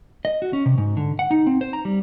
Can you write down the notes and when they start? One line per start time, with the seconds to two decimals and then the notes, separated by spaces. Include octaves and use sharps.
0.25 D#5
0.42 F#4
0.53 C#4
0.66 C3
0.78 G#2
0.97 D3
1.19 F#5
1.31 D#4
1.47 C4
1.61 C5
1.73 A#5
1.85 G3